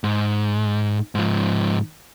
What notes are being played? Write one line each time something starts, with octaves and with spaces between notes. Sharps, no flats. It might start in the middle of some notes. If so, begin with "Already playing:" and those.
G#2
G#2 F3